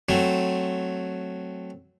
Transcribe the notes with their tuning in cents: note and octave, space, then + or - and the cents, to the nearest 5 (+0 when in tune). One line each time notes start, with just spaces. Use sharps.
F#3 +0 A3 +0 C4 +0